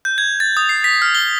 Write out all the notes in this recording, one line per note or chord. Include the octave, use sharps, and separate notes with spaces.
G6
G#6
A6
D#6
C7
B6
F6
G7